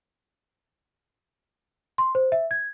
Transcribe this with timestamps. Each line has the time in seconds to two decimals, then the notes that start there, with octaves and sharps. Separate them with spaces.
1.98 C6
2.15 C5
2.32 E5
2.51 G#6